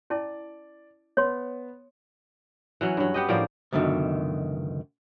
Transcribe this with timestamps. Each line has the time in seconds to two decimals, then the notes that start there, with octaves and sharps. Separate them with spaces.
0.10 C#4 E4 D5 A5
1.17 B3 C#5 C6
2.81 E3 F#3 C#4
2.97 G2 F#3
3.14 B3 G4 D#5
3.29 A2 F3 A#3 D5
3.72 C#2 F#2 B2 D3 D#3